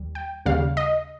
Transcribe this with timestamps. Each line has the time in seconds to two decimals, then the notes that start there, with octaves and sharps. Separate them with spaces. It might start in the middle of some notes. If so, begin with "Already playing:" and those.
Already playing: D#2 G3
0.15 G5
0.46 D#2 C#3 G3 F5
0.77 D#5